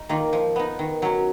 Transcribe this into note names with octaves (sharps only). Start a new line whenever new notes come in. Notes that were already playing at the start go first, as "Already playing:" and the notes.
Already playing: D#4
D#3 A#3 F4
F3
B3 D#4
D#3
F#3 C#4